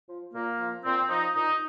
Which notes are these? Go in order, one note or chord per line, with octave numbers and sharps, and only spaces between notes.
F3
A#2 A#3
F3
A#2 C4
F3 D#4
A#2 D#4